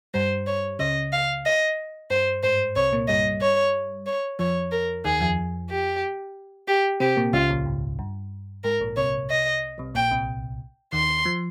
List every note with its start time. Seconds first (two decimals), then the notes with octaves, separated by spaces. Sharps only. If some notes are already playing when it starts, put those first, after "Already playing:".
0.14 G2 G3 C5
0.47 C#5
0.79 C#2 C#3 D#5
1.12 F5
1.46 D#5
2.10 G2 C5
2.43 G#2 C5
2.76 C2 C3 C#5
2.92 A#2 A#3
3.08 G2 G3 D#5
3.41 C#5
4.07 C#5
4.39 F2 F3 C#5
4.71 A#4
5.04 D#2 D#3 G#4
5.20 F2 F3
5.70 G4
6.68 G4
7.00 C3 C4 G4
7.17 A#2 A#3
7.33 C#2 C#3 F4
7.50 A#1 A#2
7.66 G#2
7.99 G2
8.64 G#2 A#4
8.80 A#1 A#2
8.96 C2 C3 C#5
9.30 D#5
9.78 C2 C3
9.94 A#1 A#2 G5
10.11 C2 C3
10.93 D#2 D#3 C6
11.25 F3